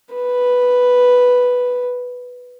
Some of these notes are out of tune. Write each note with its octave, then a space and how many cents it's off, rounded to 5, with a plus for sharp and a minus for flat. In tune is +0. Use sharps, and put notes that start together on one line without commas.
B4 +0